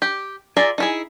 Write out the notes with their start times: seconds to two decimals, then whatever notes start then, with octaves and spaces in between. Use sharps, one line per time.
0.02 G4
0.57 F4 G#4 D5 E5 A#5
0.78 D#4 E4 G#4